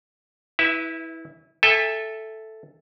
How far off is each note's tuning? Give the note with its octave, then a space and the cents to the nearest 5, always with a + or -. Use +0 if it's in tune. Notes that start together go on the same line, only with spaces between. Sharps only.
E4 -20 B4 +0 E5 +10
A4 +0 E5 +0 G#5 -40